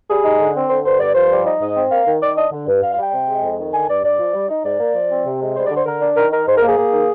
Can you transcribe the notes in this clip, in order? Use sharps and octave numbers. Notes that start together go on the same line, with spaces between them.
G3 G#4
D#4
D3
C4
D3 C5
G2 C5
G2 D5
F3 C5
G3
D#4
G#2 D#5
C4
A#3 F5
D#3
D#3 D5
D4 D#5
D3
G2
G2 F5
F5
G3 G5
C3
G#3
F2
D#3
D3 G#5
G2 D5
G2 D5
F3
G3
D#4
G#2 D5
A#3
F3
C4
C3
G#3
G3 C5
D5
D3
C5
D3 A#4
D4
D#3 A#4
D#4 A#4
G#2 C5
A#4
A#3
G#4
A#3
D#3